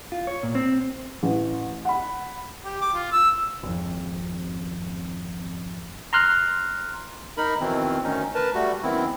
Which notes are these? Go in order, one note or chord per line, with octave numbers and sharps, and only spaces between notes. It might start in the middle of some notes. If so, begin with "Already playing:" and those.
F4
C#5
A#2
C4
A1
F#5 B5
G4
D6
F4
E6
G#1 F2
A#5 C6 F6 F#6
D#4 A#4 B5
F2 B2 D#3 E3 C4
D2 D#3 C#4 D#4
A#4 B4 A5
G3 A3 F#4
F#2 D#3 B3 C4 E4